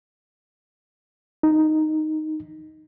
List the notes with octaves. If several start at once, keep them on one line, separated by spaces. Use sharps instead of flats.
D#4